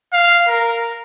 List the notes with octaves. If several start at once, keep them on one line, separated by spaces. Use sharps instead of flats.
F5
A#4